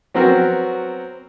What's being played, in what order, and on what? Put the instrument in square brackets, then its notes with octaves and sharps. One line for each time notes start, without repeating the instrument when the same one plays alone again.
[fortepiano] F#3 B3 C4 F#4 A#4